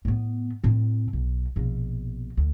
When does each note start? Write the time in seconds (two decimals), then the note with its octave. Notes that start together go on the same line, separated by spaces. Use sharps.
0.05 A2 B3
0.64 A2 C4
1.13 B1
1.56 A#1 B2
2.37 D2